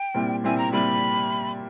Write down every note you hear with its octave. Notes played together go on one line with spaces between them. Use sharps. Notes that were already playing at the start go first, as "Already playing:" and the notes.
Already playing: G5
A#2 G3 C4 E4
A#2 G3 C4 E4 G#5
A#5
A#2 G3 C4 E4 B5